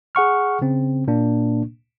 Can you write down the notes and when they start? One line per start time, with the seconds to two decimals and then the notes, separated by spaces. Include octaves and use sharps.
0.15 G#4 F#5 C#6 F6
0.62 C#3 C4
1.08 A#2 A#3 D4